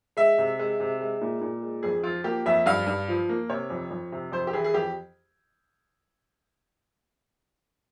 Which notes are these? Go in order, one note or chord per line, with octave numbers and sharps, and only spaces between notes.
G#3 E5
C3
G#3
C3
G#3
A#2
A#2
G#3
F2 G#4
F3 F4
A#3 G4
F2 E5
G2 F5
G2
F3
A#3
C3 C#5
F2
F2
C3
F2 C5
G4
E3 G#4
G#4
F2 G4